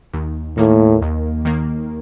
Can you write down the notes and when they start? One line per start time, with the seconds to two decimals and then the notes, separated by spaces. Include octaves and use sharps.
0.13 D#2
0.57 A2 D#3 A#3
1.02 D#2
1.45 D#3 A#3